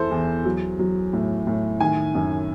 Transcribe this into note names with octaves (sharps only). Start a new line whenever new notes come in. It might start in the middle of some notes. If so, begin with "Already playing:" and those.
Already playing: E2 E3 A4 C5
E2
F#3
F#3
A2
A2
D#3 G#5
F#2